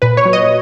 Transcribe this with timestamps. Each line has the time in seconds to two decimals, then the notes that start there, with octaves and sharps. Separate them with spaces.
0.02 A#2 B4
0.17 C#5
0.25 F#3
0.33 D#5